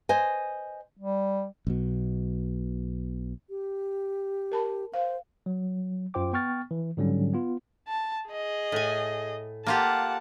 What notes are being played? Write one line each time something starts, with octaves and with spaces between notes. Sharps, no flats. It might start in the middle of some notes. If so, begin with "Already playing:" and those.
C5 D#5 G#5
G3
B1 B2
G4
A#4 A5 B5
C5 F5
F#3
F#2 F4 C5 G5 D6
B3 G5 C#6 F6 A6
E3
G#2 D3 F#3 G3 C#4
B3 F4
A5
G#4 D#5
A2 G#5
A#3 F4 G4 F#5 A5